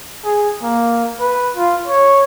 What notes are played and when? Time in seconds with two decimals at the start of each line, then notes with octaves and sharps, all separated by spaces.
0.25 G#4
0.63 A#3
1.20 B4
1.56 F4
1.87 C#5